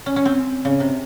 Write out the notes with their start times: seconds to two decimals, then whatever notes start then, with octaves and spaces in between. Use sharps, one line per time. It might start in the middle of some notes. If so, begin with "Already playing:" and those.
0.06 C#4
0.16 C#4
0.25 C4
0.65 C#3
0.80 C3